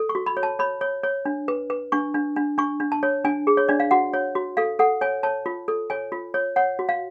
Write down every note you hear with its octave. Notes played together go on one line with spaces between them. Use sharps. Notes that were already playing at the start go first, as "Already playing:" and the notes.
Already playing: A4
C#6
F#4
B5
C#5
A5
C#5 B5
C#5
C#5
D4
B4
B4
D4 C#6
D4
D4
D4 C#6
D4
A5
C#5
D4 G#5
G#4
C#5
D4 D5
F5
F#4 F#5
C#5
F#4
A4 F5
A4 F#5
C#5 G#5
C#5 A5
F4
A4
C#5 G#5
F4
C#5
C#5 F#5
F#4
F5